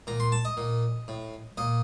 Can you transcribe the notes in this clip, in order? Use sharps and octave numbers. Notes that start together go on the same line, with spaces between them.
A#2 A#5
C6
A5
D#5
A#2
A2
A#2 D#5